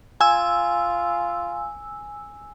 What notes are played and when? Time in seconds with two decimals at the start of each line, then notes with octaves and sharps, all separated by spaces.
0.21 F4 G#5 E6